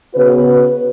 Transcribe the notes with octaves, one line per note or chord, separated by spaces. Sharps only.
C#3 B3 F#4 B4